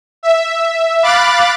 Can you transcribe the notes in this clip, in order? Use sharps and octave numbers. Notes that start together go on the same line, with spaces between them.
E5
F5 B5 D6 F#6 A6